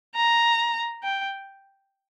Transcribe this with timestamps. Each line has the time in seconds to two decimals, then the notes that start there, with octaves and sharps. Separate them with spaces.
0.16 A#5
1.04 G5